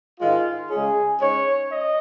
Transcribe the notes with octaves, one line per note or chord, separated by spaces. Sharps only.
G#2 D#3 G#3 D#4 F4
C#3 G#3 C#4 G#4
G#2 G#3 C#4 C#5
D#5